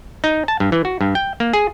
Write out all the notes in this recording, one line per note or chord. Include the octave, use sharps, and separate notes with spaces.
D#4
A5
G2
E3
F#4
G2
G5
A#3
G#4